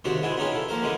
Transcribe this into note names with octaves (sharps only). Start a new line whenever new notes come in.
D#2 G#2 C3 D4 F#4 C5
G#3 B3 D4 E4 G#4
B3 C#4 D#4 F4 G4 G#4
E4 A4
F3 A#3 A#4 C5
D3 E3 G#3 A#3 C#4